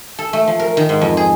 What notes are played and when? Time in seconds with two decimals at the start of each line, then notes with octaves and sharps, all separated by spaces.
0.19 A4
0.33 A3
0.47 F3
0.60 A#4
0.77 D#3
0.89 G#2
1.01 F2
1.17 G#4